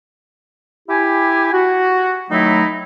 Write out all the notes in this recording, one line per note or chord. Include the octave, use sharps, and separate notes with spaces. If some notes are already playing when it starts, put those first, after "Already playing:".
E4 G4 G#5
F#4
D#3 F#3 A3 D#4 E4